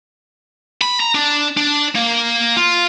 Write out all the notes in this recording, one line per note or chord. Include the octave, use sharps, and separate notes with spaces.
B5
A#5
D4
D4
A#3
F4